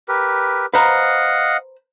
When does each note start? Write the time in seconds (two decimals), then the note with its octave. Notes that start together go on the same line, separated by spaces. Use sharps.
0.08 G4 A#4 B4
0.74 B4 C5 D#5 F5 F#5 A#5